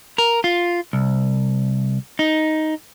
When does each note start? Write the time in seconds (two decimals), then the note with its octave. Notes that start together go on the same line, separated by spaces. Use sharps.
0.18 A#4
0.44 F4
0.93 C2
2.19 D#4